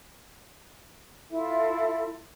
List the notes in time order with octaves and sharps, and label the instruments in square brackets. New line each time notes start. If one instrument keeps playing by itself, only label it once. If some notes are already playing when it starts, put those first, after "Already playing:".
[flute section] E4 F4 A4 E5